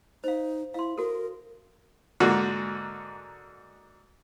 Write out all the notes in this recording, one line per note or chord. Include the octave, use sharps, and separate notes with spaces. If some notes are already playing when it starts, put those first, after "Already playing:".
D#4 C5 F5
E4 F5 C6
F#4 A4 A#4
G#2 D3 A#3 F#4